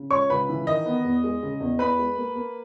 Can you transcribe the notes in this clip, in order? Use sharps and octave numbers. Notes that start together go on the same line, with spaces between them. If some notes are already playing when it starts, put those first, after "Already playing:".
Already playing: C#3
C#2 C#5 C#6
C#2 B4 B5
E3
D#3 D#5
B3
E2
G#3
C#3
E2
E2 B4 B5
G#3
A#3
A#3